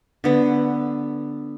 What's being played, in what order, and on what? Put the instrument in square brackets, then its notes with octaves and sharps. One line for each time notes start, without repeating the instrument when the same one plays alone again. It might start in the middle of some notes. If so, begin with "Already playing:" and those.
[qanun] D3 B3